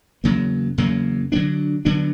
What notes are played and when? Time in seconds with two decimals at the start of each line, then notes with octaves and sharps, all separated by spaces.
0.24 E2 C#3 F#3 A#3
0.78 E2 C#3 F#3 A#3
1.32 D3 F#3 B3 D4
1.85 D3 F#3 B3 D4